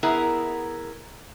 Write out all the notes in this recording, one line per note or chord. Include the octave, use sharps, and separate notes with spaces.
B3 E4 G#4 A#4